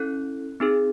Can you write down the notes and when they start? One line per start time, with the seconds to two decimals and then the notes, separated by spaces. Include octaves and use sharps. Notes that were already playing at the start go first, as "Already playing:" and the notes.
Already playing: C#4 E4 A4 F#6
0.60 C4 D#4 G#4